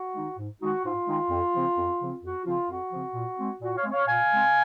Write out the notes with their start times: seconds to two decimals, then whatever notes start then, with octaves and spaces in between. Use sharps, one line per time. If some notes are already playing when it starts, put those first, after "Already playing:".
Already playing: F#4
0.15 D#3 G#3 D#4
0.38 G#2
0.61 D#3 G#3 D#4 F#4
0.83 G#2 F4
1.07 D#3 G#3 D#4
1.30 F2
1.53 C#3 F3 C4
1.77 F2
1.99 C#3 F3 C4
2.22 F2 F#4
2.45 C#3 F3 C4 F4
2.69 F2 F#4
2.92 C#3 F3 C4
3.14 A#2
3.38 G#3 C4
3.61 A#2 F#4
3.76 C#5 F5
3.84 G#3 C4
3.91 C#5 F5
4.07 A#2 F5 G#5
4.30 G#3 C4